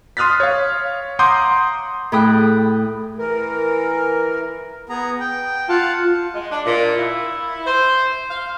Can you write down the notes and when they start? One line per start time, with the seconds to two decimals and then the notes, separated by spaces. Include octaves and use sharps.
0.17 C6 D#6 F6 F#6 A6 B6
0.40 C#5 F5
1.19 F#5 A#5 C6 D6 D#6 G6
2.12 A2 G#4 G5 B5 D#6 F#6
3.18 E3 A#4
4.89 B3 G#4 A#5
5.20 G5
5.69 F4 F5 F#5 A5
6.33 G#3
6.51 D4
6.65 A#2
6.96 E4
7.66 C5
8.29 F5